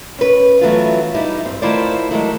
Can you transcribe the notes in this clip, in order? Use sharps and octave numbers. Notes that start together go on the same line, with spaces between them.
C#4 B4
E3 F#3 A3 B3 C#4 F4
G3 D#4 E4
G2 C4
D#3 A3 E4 F4 C5 D5
D#3 F#3 G#3 A3 E4